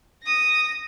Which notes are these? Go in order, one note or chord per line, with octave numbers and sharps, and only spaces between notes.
D#6 A#6